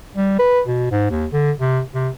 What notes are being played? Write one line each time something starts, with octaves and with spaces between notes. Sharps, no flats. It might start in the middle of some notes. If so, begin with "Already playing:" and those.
G3
B4
B2
G#2
D#2
D3
C3
C3